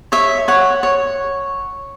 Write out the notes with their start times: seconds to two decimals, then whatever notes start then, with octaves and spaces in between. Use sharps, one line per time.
0.12 C#5 E5
0.48 C#5 F#5
0.83 C#5